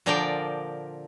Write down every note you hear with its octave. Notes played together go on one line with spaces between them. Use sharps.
A#2 D3 F3 A#4 D5 G5